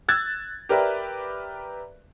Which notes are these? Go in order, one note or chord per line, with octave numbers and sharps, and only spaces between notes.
E6 F#6 G#6 A6
G4 A#4 B4 D5 E5